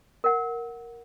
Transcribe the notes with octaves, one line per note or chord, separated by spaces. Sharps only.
A#4 F#5